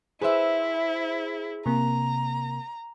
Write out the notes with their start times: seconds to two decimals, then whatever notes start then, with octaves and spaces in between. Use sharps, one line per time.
0.22 E4 G#4 B4 C5 E5
1.66 C3 A#3 A#5